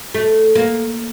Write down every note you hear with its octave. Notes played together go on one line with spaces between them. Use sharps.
A3
A#3